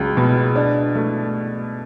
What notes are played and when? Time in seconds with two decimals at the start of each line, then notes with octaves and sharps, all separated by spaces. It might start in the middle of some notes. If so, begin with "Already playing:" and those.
Already playing: C#2 F#3
0.17 B2
0.56 D4
0.95 A3